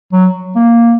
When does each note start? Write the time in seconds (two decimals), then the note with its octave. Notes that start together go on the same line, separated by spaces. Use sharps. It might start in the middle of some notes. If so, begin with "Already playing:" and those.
0.13 F#3
0.56 A#3